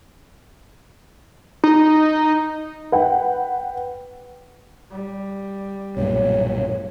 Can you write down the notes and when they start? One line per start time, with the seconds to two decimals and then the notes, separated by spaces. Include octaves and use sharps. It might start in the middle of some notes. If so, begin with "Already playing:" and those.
1.64 D#4
2.92 B4 F#5 G5
4.91 G3
5.97 B1 G2 A#2 C#5